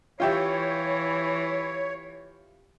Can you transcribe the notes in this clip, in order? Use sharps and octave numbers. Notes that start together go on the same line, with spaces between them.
E3 F4 G4 C#5 E5